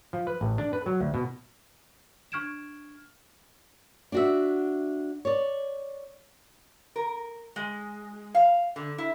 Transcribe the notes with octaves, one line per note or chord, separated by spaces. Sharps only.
F3
B4
A1
D4
B4
F#3
D2
B2
D4 C#6 F6 G#6 D7 E7
D4 F#4 E5
C#5 D5
A#4
G#3
F5
D3
E4